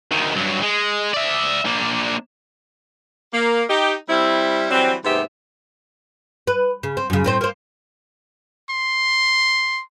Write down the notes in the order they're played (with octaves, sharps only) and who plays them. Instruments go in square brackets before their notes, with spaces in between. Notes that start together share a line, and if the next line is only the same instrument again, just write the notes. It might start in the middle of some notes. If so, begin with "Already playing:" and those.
[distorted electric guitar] D2 D#3
G2 F#3
G#3
D5 E5
A#3 D4
[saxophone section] A#3
D#4 G4
G3 C4 E4
E3 F#3 G3 C4
D#2 G#2 C3 B3 G4 E5
[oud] B4
C#3
C4
F#2 C#3
A2 C4 C5
A#3 C5
[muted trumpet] C6